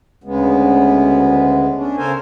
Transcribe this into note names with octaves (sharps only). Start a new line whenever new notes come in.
D2 C#3 G#3 B3
C#4 D4
C#3 A4 A#4 C5 G#5